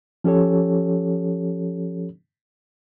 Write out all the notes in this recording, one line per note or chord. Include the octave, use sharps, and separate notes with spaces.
F3 C#4 G4 A4 C#5